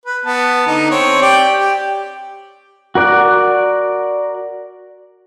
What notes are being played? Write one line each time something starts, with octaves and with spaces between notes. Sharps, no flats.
B4
B3 A5
D3 D#4
C4 C#5
G4 D5 G5
G4
F#4 A#4 D5 F#6